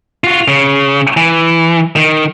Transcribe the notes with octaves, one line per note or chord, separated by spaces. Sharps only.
F4 F#4
C#3
E3
D#3